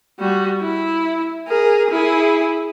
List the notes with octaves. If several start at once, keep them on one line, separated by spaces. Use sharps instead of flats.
G3 F#4
E4
G#4 A#4
E4 G#4